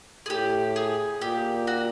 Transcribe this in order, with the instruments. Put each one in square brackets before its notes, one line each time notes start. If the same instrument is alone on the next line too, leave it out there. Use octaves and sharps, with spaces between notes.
[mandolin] G#4
[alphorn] A2 [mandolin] G4
[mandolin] G#4
[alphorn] A#2 [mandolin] G4
[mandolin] F#4